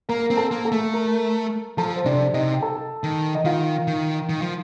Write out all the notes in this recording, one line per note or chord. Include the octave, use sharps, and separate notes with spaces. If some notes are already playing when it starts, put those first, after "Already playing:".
A#3 A#4 A#5
C4
A4 A5
A#3
A4 A5
A3
A#4 A#5
F3 A4 A5
C5
C3 D4 D5
C3 D#4 D#5
G5
A4 A5
D#3
D#5
D#3 F4 F5
D#3
D#3
F3